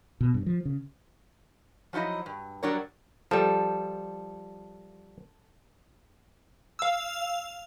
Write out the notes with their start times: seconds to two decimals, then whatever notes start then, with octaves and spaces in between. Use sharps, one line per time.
0.21 B2
0.34 G2
0.46 F3
0.65 C#3
1.93 F3 F#3 D#4 E4 D#5
2.26 G2
2.63 F#3 G3 D4 A#4 C#5
3.31 F3 G3 A4
6.79 F5 E6